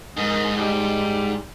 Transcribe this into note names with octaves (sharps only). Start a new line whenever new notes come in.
G#2 A#4 D#5
G3 D#4